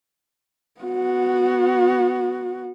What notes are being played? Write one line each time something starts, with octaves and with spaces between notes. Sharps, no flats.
B3 F#4